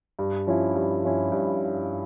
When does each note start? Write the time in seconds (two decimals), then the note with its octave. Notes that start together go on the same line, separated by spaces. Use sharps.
0.19 G2
0.47 F3 C#4 E4
0.75 G2
1.03 F3 C#4 E4
1.32 G2